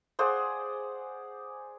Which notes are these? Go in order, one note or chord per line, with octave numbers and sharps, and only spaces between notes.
G#4 C5 D5 F#5